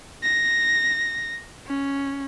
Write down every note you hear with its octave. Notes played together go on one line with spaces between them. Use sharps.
A#6
C#4